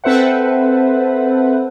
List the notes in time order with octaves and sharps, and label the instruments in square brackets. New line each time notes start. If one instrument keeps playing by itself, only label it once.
[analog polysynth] C4 A4 B4 C5 E5 F#5